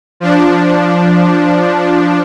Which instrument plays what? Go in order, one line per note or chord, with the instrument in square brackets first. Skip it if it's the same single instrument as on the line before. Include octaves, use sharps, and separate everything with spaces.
[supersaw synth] F3 D4